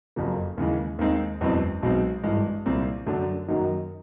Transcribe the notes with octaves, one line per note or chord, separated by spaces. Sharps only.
F#1 F2 C#3 F3 A#3
D#2 C#3 E3 G#3
D#2 D#3 G#3 C4 D#4
F#1 E2 B2 G#3 C4
B1 B2 G#3 C4
G#1 G2 E3 G#3
C2 A#2 G3 C4
F#2 D3 F#3 A3 D4
F#2 D#3 F#3 A#3 D#4